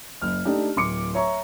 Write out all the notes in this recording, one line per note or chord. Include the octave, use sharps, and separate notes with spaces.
F#1 F6
A3 D4 D#4 G4
D1 C6 D6 C#7
C#5 E5 A#5 C#6